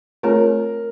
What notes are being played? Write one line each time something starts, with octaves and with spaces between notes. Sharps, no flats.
A3 C4 F4 G#4 A#4 C#5